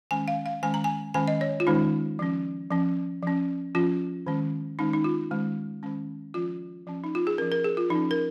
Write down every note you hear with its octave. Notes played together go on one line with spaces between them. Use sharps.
D#3 G#3 C#4 G#5
F5
F5
D#3 G#3 C#4 G#5
A#5
G#5
D#3 G#3 C#4 G#5
D#5
C#5
F4
D#3 G#3 C#4 D#4
F3 C#4
F3 C#4
F3 C#4
F3 C#4 F4
D#3 G#3 C#4
D#3 G#3 C#4 D#4
D#4
F4
D#3 G#3 C#4
D#3 G#3 C#4
F3 C#4 F4
F3 C#4
D#4
F4
G#4
F3 C#4 A#4
A#4
G#4
F4
F3 D#4
C#4
A#4